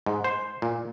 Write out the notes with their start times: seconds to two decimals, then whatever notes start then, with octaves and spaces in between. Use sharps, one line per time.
0.06 G#2
0.24 C5
0.62 A#2